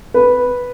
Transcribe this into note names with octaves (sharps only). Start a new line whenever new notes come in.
B4